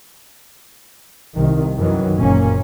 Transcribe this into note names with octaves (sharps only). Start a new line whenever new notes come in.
C2 D#3
F#2 D#3 E3 F#3
F#1 A#2 A#3 C#4